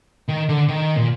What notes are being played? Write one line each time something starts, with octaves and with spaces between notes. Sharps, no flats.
D#3
D3
D#3
A#2